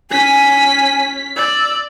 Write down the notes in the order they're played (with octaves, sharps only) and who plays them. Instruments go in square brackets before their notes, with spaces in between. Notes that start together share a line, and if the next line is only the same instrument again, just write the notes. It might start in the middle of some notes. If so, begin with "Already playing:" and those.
[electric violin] C#4 B6 [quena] G#5
[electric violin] D5 [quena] E6